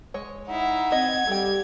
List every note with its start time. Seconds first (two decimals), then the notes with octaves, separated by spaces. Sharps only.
0.14 G#3 C#5
0.48 D#4 E4 F#5
0.92 C4 D#5 G#6
1.27 G3 A4 G5